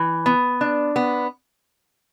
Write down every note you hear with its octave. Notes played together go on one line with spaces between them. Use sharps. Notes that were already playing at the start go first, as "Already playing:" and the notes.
Already playing: E3
B3
D4
B3